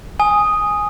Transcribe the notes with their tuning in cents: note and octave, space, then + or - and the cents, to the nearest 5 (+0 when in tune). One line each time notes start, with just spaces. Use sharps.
G#5 +0 D#6 +0